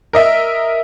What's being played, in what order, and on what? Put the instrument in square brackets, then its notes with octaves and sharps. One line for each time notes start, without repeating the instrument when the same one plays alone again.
[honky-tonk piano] A#4 D#5 E5